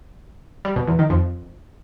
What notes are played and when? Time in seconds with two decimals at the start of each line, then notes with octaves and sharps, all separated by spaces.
0.65 G3
0.76 B2
0.88 E2
0.99 D#3
1.10 F2